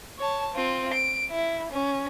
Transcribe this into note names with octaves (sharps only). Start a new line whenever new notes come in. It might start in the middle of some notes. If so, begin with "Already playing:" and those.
C#5 A5
C4 F4
D7
E4
C#4